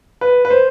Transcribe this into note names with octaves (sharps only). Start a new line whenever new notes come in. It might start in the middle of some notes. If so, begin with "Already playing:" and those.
B4
B4
C5